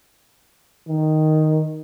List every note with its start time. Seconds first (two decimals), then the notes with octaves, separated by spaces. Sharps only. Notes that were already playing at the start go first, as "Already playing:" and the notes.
0.88 D#3